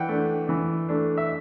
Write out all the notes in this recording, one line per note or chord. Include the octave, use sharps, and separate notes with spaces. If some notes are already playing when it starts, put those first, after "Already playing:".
Already playing: E3 F#5 G5
A3 D4
E3
A3 D4
E5